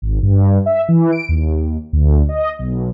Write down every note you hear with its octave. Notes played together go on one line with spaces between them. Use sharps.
G#1
G2
E5
E3
D7
D#2
D2
D#5
B1